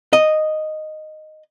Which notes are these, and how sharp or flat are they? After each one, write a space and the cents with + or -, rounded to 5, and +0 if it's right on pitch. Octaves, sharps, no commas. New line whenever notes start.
D#5 -5